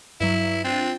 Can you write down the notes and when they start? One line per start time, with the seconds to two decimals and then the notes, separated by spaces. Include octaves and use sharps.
0.21 G2 F#3 E4
0.64 C4 D4 F4 A6